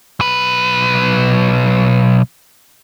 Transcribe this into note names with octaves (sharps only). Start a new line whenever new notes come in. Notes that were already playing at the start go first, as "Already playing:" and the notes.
B1 B4